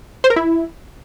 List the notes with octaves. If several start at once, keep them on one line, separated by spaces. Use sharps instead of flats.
C5
A#4
E4